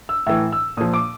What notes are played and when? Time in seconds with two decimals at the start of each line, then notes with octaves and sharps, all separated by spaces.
0.09 E6
0.26 A2 E3 E6
0.52 E6
0.77 A#2 F3 D#6
0.94 D6